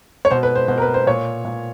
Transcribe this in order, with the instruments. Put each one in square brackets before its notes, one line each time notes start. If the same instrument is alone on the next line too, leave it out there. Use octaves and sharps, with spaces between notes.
[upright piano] C#5
B2 C5
B4
C5
B2 C5
A#4
B4
C5
A#2 C#5
A#2